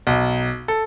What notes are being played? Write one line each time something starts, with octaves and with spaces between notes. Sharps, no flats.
B1
A4